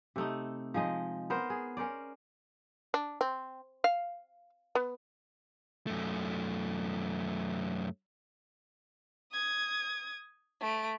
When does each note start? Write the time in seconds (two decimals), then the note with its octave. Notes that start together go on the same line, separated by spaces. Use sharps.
0.16 C3 A3 D#4
0.74 F3 G#3 D#4 D#5
1.30 B3 A#4 C5
1.50 G#4
1.77 C#4 A#4 C5 D5
2.94 D4
3.21 C4
3.84 F5
4.75 B3
5.87 F#2 A3
9.32 D#6 G#6
10.61 A3 D7